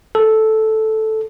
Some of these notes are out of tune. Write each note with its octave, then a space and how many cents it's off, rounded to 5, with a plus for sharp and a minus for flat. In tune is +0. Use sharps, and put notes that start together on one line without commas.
A4 -5